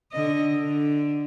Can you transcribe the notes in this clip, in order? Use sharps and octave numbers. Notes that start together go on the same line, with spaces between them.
D3 D#5
D3